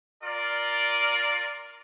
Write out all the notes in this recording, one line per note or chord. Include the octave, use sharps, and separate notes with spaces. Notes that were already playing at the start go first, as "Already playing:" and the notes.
F4 A#4 D5